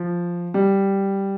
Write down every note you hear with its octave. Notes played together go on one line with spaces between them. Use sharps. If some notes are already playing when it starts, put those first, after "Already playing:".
Already playing: F3
G3